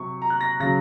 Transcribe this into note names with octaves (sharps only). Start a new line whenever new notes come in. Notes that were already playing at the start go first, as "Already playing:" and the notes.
Already playing: C3 F#3 C#6
A#5
F#6
A#6
C#3 F#3 A#6